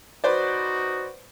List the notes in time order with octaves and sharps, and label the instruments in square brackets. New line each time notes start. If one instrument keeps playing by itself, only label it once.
[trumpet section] D#4 F#4 [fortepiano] B4 C5 D5